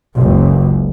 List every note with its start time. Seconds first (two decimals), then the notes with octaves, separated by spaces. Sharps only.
0.17 F#1 C#2